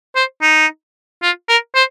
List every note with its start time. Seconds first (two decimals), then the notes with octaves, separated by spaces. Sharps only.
0.16 C5
0.42 D#4
1.22 F4
1.49 A#4
1.75 C5